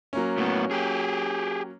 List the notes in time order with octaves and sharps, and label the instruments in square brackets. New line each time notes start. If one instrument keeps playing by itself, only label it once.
[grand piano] F#3 A#3 C#4
[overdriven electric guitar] A2 B3
G4 G#4